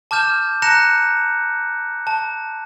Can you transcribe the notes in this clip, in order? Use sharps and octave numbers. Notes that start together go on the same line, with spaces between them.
A5 D6 F6 G6 E7
A5 A#5 F#6 A#6 C#7 E7
A5